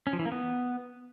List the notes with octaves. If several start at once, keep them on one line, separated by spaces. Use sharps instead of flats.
C#4
F3
E3
A#3
B3